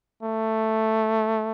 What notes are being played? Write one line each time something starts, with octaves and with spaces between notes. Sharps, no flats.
A3